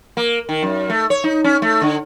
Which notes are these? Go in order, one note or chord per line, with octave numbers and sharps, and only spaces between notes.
A#3
D#3
F#2
A3
C#5
D#4
C#4
A3
D3